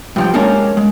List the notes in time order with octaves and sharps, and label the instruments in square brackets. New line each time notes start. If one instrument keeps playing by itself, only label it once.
[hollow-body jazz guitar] G2 F3 G5
G#3 A#3 C#4 D4 A#4
G#3